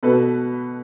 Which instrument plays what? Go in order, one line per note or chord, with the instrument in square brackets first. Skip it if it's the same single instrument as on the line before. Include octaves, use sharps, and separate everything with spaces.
[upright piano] B2 A4 B4